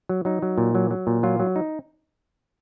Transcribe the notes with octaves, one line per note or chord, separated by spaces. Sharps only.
F#3
F#3 D#4
F#3
A#2
F#3
F#3
A#2
F#3 F4
F#3
D#4